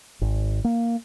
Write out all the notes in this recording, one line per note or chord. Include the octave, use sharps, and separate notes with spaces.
G#1
A#3